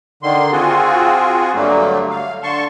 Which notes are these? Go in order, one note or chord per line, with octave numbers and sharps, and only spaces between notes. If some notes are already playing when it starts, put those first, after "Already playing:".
D3 D#3 C6
C4 F4 F#4 G#4
G2 D3 F#3 A3 A#3
F5
D3 A5 C6 C#6